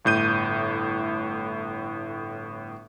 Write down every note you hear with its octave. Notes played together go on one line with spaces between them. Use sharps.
G1 A2 G6 D#7